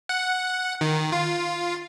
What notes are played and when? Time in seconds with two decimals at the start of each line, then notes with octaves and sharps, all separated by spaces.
0.09 F#5
0.81 D#3
1.12 F4